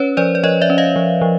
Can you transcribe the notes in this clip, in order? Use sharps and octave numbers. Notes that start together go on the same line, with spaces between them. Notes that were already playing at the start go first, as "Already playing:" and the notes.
Already playing: C#4 B4 C#5
F3 C5 D5
D5
F3 C#5 D#5
D5 E5
C#4
D#5 F5
F3
F3